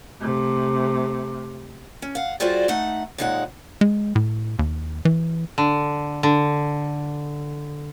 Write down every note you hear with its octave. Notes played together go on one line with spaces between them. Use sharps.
C3 A3
C#4
F5 F#5
G3 F4 F#4 G#4 C5 D5
A3 D#4 F#5
D#2 A#2 G#3 D#4 A4 F#5
G#3
A2
D#2
E3
D3
D3